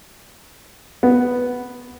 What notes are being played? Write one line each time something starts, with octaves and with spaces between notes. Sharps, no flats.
B3